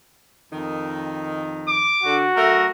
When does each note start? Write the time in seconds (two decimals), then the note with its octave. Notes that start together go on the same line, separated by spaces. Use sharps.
0.51 F2 D#3
1.68 D6
2.03 D3 F#4
2.36 F#2 A3 A#4